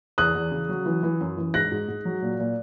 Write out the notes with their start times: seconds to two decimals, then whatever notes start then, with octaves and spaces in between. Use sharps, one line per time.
0.18 E2 D#6 F#6
0.35 E2
0.52 C#3
0.69 F#3
0.86 E3
1.03 E3
1.21 F#2
1.38 E3
1.54 G#2 F#6 A#6
1.72 G#2
1.88 G#2
2.05 F#3
2.22 A#2
2.39 A#2